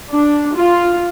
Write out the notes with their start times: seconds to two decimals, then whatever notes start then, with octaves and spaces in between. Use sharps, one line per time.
0.10 D4
0.55 F4